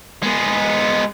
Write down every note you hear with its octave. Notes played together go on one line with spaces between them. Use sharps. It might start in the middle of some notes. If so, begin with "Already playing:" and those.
G#3 B3